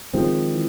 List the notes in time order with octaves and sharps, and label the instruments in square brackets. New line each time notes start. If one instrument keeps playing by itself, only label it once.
[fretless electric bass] D#3 G#3 C4 [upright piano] F3
[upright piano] E3